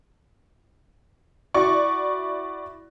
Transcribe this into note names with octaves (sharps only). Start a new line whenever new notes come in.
E4 F#4 D5 C#6